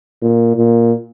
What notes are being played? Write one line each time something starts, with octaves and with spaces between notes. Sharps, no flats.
A#2
A#2